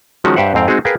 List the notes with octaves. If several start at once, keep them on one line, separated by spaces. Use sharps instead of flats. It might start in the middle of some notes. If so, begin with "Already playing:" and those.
D#3 F3 F#3 G#3 C#4 F#4
G2 G4 C5 E5 F#5
F2 G#2 C4 F5 G5
G#3 C4 D#4 F#4 G#4
G#4 A#4 B4 F5 G5